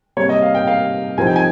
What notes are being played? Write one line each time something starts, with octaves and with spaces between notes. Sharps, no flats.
C3 G3 A#3 C#5
D#5
F5
G5
F5
C2 C3 F3 C4 D#4 G#5
G5
G#5